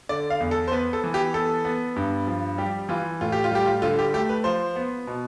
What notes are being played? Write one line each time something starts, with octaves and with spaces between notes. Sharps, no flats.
D3 D5
F5
E2
A4
C5
B3 B4
A4
E3
G4
B3 A4
B3
G2
F3
G3 G4
E3 F4
A2 F4
G4
F4
G3 G4
F4
D3 F4
G4
A3 G4
B4
F3 C5
B3
B2